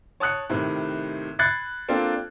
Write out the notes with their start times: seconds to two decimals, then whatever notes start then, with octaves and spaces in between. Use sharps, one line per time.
0.20 C#5 A5 D#6 F#6 C#7
0.50 A2 C3 D#3
1.39 B5 F#6 G#6 A6 C7 C#7
1.89 A#3 C4 D4 F4 A4